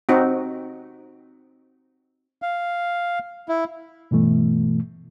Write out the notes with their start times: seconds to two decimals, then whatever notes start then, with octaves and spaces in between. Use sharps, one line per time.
0.09 C4 D#4 F#4
2.42 F5
3.49 E4
4.11 G2 B2 E3 A3